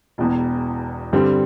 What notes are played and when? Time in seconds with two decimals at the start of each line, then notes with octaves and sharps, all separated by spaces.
0.18 E1 E2 B2
1.13 G2 D3 G3 C4